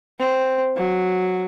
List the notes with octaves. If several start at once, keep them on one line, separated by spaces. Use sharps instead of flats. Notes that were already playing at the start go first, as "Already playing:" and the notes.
C4
F#3